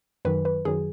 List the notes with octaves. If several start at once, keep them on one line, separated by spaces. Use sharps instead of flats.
F#2 D#3 F#3 B4
B4
F#2 D#3 F#3 G#4